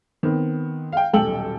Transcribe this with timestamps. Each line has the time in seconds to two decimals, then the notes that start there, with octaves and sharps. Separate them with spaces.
0.23 D#3 B3 C4
0.92 F5 G5
1.13 D#1 B1 A4 G5 E6 F#7